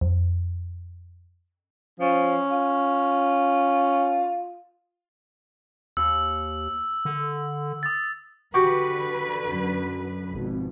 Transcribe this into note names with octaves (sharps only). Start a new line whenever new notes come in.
F2
F3 C#4
F4
D#2 E6
D3
D#6 A6
D3 F#4 G4 B4
F#2
G#1 F2 B2